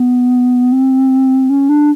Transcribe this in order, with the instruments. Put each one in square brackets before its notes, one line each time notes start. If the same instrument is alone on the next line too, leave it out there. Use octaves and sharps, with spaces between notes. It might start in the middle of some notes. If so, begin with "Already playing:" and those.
Already playing: [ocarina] B3
C4
C#4
D4